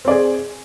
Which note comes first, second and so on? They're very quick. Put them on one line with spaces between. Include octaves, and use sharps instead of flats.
C4 D5 G#4